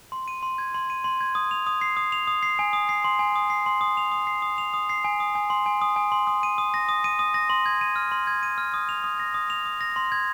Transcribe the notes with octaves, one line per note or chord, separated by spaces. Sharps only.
C6
D#7
C6
G#6
C6
D#7
C6
G#6
D#6
F7
D#6
C7
D#6
F7
D#6
C7
G#5
D#6
C7
C6
G#5
D#6
C7
C6
D#6
F7
D#6
C7
D#6
F7
D#6
C7
G#5
D#6
G#5
C6
G#5
D#6
G#5
C6
D#6
D#7
D#6
A#6
D#6
D#7
D#6
A#6
C6
G#6
D#7
F6
C6
G#6
D#7
F6
D#6
F7
D#6
A#6
D#6
F7
D#6
A#6
C6
G#6